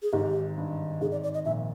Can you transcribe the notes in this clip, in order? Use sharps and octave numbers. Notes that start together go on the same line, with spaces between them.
G#4
G#1 G#2 G4
G2
G#1 G#2 G#4
D5
D5
D#5
A#1 A#2 E5